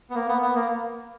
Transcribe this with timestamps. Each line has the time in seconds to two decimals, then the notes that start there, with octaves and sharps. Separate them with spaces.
0.10 B3
0.15 A#3
0.28 B3
0.42 B3
0.55 A#3